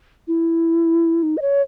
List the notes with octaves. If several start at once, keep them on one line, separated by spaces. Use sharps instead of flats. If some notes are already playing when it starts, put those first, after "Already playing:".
E4
D#4
D#5
C#5